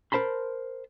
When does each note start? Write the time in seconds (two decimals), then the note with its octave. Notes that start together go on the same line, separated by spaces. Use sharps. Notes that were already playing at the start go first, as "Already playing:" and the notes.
0.12 A#4 C5 A5 B5 C6